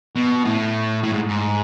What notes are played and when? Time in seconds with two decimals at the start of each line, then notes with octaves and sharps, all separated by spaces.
0.16 B2
0.45 A2
1.03 A2
1.12 G#2
1.28 G#2